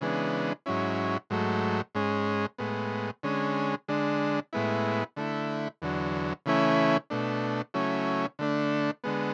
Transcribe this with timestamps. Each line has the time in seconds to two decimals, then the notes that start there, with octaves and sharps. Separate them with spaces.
0.01 C#3 E3 G#3 B3 D4
0.66 G#2 F#3 C#4 E4
1.30 G#2 F#3 A3
1.95 G#2 G#3 C#4
2.58 A2 G#3 B3
3.23 D3 G#3 C#4
3.88 D3 G#3 D4
4.53 A2 G#3 B3 E4
5.16 D3 A3 E4
5.82 E2 D3 F#3
6.46 C#3 E3 A3 C#4 E4
7.10 B2 A3 D4
7.74 C#3 F#3 A3 C#4 E4
8.39 D3 A3 D4
9.04 D3 G#3 B3